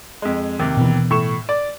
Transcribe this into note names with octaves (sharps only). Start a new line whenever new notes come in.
F2 G#3
D#2 C3
B2 E3
A2 C#6 E7
D5